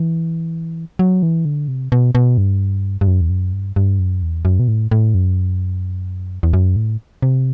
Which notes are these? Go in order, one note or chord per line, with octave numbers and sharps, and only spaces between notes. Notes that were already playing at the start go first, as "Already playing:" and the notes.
Already playing: E3
F#3
E3
D3
C3
B2
B2
G2
G2
F#2
E2
F#2
G2
G2
F#2
E2
F#2
B2
A2
A2
F#2
E2
F#2
A2
C3